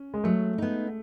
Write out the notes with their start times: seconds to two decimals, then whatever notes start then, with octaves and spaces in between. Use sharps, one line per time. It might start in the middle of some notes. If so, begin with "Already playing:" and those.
Already playing: C#4
0.14 G#3
0.24 F#3 A3
0.58 B3 D#4